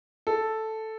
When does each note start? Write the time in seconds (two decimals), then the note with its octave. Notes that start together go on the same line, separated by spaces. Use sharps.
0.27 A4